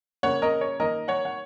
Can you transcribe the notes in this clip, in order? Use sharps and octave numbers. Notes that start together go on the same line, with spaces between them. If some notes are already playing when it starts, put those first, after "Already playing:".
C#3 A#3 C#5 F#5
A#4 D#5
C#5
D#3 A#3 A#4 D#5
C#5 F#5
F#5